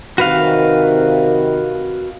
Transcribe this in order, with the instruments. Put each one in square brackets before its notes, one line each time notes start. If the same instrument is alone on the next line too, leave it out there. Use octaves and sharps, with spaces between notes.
[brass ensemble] C3 D#3 [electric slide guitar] F#4 B4 F5